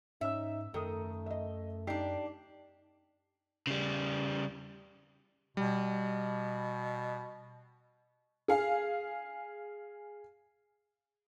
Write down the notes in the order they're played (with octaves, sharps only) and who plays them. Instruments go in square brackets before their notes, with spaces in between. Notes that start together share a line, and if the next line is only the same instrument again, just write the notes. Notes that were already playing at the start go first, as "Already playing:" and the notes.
[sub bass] G#2 [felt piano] C#4 E6 [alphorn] D#4 [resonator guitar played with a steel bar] E5
[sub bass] F#2 [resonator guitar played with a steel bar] D#3 [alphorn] A3 [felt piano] A4 A#4 D#6
[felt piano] D#5 E5
[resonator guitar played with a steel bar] D4 G4 [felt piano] D#4 D5 C7
[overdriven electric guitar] C#3 G3
[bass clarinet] B2 [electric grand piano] G3
[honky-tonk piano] G#4 F5